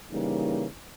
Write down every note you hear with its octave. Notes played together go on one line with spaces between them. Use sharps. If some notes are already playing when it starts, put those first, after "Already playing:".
C#3 E3 G3 A#3 D#4